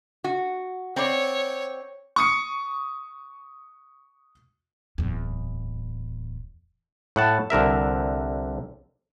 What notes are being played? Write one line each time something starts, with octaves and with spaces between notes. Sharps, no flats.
F#4
C4 C#5 D5
C#6 D#6 C#7
D1 E2
A2 F#5 A5
C2 D3 A#4 E5